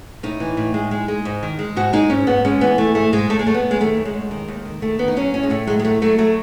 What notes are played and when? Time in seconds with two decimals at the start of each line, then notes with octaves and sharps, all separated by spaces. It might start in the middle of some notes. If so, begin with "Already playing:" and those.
0.23 A2 D#4
0.40 E3
0.57 A2
0.74 G#3
0.91 G#3
1.08 G#3
1.25 G#2
1.43 D#3
1.59 G#3
1.76 G#2 F#4
1.93 G#3 D#4
2.10 G#2 C#4
2.27 G#2 B3
2.45 G#3 C#4
2.61 E3 B3
2.78 E3 A3
2.95 G#2 A3
3.12 G#2 G#3
3.30 F#2 A3
3.39 G#3
3.46 F#2 A3
3.54 B3
3.63 F#2
3.71 G#3
3.80 D#3 A3
3.97 F#2
4.05 G#3
4.14 F#2
4.31 D#3
4.48 D#2
4.65 D#3
4.82 D#3 A3
4.99 D#3 B3
5.08 D#4
5.16 F#3 C#4
5.34 A2 C#4
5.43 G#3
5.50 A2 A3
5.67 F#3 G#3
5.79 G#3
5.84 F#3 A3
6.02 F#3 A3
6.18 F#3 A3